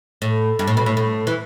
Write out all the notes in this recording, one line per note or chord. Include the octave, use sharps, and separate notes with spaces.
A2
G2
A2
B2
A2
A2
E3